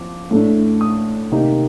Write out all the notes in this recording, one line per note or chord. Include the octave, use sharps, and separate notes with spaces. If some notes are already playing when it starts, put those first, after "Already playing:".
Already playing: F3 C4 D6
A2 A3 D4
D#6
C3 D#3 A#3 D#4